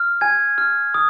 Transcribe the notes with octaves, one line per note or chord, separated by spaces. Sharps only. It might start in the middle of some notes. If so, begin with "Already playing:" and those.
Already playing: F6
G#5 G#6
F6
D#6